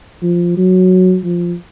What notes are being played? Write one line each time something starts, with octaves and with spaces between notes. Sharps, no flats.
F3
F#3
F3